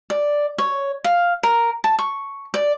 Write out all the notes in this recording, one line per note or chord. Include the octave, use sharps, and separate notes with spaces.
D5
C#5
F5
A#4
A5
C#6
D5